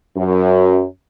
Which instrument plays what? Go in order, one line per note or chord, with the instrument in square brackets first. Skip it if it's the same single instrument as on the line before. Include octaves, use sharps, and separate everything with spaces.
[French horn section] F#2